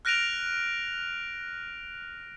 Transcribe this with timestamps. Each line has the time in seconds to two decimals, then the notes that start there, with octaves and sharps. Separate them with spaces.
0.05 F6 F#6 A#6 D7 D#7 F7